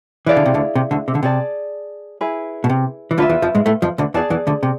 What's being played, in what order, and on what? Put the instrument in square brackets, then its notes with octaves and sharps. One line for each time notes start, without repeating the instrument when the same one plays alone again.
[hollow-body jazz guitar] E3 [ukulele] E4 G#4 D5 F5
[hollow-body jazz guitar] D3
C3
D2 D3
C3
D2 D3
C3
D3
[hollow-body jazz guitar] C3 [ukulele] G#4 D5 A5
[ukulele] E4 G#4 B4
[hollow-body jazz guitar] B2
C3
E3
[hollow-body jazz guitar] D2 D3 [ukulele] F4 B4 E5
[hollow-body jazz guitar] E2 E3
F2 F3
G#2 G#3
A2 A3
F2 F3
D2 D3
[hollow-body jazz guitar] E2 E3 [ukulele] G#4 D5 A5
[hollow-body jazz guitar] E2 E3
D2 D3
C3